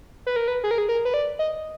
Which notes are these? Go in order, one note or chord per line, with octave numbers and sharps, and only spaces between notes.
B4
A#4
B4
G#4
A#4
G#4
A#4
B4
D5
D#5